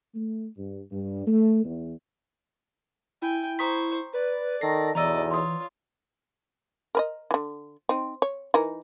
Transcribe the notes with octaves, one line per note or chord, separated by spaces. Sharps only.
A3
G2
G2
A3
E2
E4 G5 G#5
C5 A#5 C#6 D#6 B6
B4 D5
D#3 A4 A#6 C7
B1 E2 E3 D5 D#5 A#5 E6
F4 C#5 C6 D#6
A#4 B4 D#5
D3 E3
C4 D#4
C#5
E3 D#4 A#4